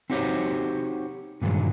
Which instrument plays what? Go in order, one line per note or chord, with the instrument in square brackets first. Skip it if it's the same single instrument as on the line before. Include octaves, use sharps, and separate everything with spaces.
[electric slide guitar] C4 D#4 F#4 G4 C5 C#5
G2 A#2 D3 D#3 F#3 G#3